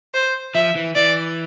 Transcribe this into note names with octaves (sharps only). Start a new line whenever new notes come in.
C5
F3 E5
E3
E3 D5